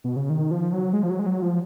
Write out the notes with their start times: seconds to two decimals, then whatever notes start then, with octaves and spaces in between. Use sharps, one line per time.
0.04 B2
0.16 C#3
0.30 D#3
0.51 F3
0.73 F#3
0.93 G#3
1.03 F3
1.10 F#3
1.19 G#3
1.26 F#3
1.42 F3